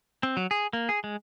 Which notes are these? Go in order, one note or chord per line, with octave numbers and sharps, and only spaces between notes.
C4
F#3
G#4
A#3
G#4
G#3